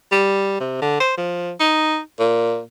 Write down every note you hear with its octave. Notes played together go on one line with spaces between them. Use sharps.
G3
C3
D3
C5
F3
D#4
A#2